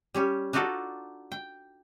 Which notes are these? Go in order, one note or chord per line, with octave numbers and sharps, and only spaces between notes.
G3 C#4 G4
D4 D#4 F4 F#4 A4 D5
G5